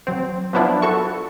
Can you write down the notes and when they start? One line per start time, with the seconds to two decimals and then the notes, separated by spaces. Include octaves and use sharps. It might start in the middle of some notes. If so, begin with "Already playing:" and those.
0.07 F#3 C4
0.53 F3 F#3 B3 D4 E4 F4
0.82 F#4 A4 C#6